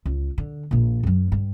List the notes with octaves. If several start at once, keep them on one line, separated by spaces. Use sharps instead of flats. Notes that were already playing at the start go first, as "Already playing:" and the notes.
C#2
D3
A#1 A#2
F#2 F#3
G2